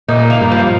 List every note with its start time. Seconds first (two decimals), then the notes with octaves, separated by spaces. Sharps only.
0.09 A#2 D#4
0.30 A#3
0.41 G2
0.52 F3